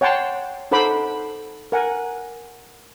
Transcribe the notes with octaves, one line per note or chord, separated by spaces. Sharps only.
C#5 F#5 G5 A5 C6
D#4 A4 C5 F#5 B5 D6
A#4 F#5 G#5